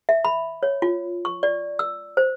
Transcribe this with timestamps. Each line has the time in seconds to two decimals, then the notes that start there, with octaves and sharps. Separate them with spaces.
0.09 E5
0.25 B5
0.63 C#5
0.82 F4
1.25 C#6
1.43 D5
1.79 E6
2.17 C5